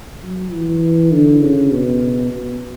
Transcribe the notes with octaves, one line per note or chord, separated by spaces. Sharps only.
F#3
E3
D3
C#3
B2
B2